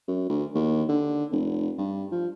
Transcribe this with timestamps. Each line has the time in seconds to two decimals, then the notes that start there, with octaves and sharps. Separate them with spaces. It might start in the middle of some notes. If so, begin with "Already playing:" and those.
0.08 F#2
0.29 D2
0.55 D#2
0.89 D3
1.31 F1
1.78 G2
2.12 F3